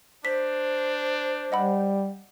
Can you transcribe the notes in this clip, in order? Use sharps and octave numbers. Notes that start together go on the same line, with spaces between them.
D4 C5 B6
G3 D#5 F#5 B5